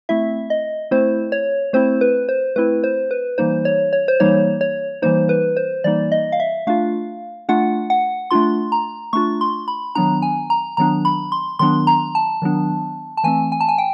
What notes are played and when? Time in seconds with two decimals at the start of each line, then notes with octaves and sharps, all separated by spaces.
0.09 A3 C4 E4 E5
0.50 D#5
0.91 A3 C4 E4 C5
1.32 C#5
1.73 A3 C4 E4 C5
2.01 B4
2.29 C5
2.56 A3 C4 E4 B4
2.84 C5
3.11 B4
3.38 E3 G3 A#3 D#4 C5
3.65 C#5
3.93 C#5
4.08 C5
4.20 E3 G3 A#3 D#4 C#5
4.61 C#5
5.02 E3 G3 A#3 D#4 C5
5.29 B4
5.57 C5
5.84 E3 G3 A#3 D#4 D5
6.12 D#5
6.32 F5
6.40 E5
6.67 A3 D4 F4 F5
7.49 A3 D4 F4 F#5
7.90 F#5
8.31 A3 D4 F4 C6
8.72 A#5
9.13 A3 D4 F4 C#6
9.41 C6
9.68 B5
9.95 D#3 F#3 B3 D4 A#5
10.22 G#5
10.50 A#5
10.77 D#3 F#3 B3 D4 A#5
11.05 B5
11.32 C6
11.59 D#3 F#3 B3 D4 C6
11.87 A#5
12.15 A5
12.42 D#3 F#3 B3 D4
13.17 A5
13.24 E3 A3 C4 G#5
13.52 G#5
13.61 A5
13.69 G#5
13.78 G5